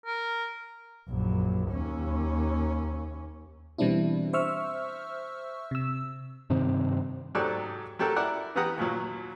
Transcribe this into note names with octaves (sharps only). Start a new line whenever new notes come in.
A#4
A#1 F#2
D#2 C#4
B2 E3 G3 C4 D4 E4
C5 E5 C#6 E6 F6
C3 E6
G2 C3 D#3 C4
G#2 F#3 G4 A4 D5 F#6
F#3 G4 A4 A#4 F#6
E4 A#4 D5 F#5
E3 B3 G4 F#5 A#5 D#6
D#2 A#2 F#3